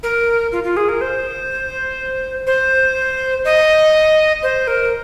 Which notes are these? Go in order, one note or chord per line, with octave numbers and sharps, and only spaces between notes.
A#4
F4
F4
G#4
A#4
C5
C5
D#5
C5
A#4